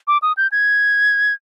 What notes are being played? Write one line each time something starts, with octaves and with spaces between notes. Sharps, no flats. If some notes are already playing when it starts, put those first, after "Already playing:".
D6
D#6
G6
G#6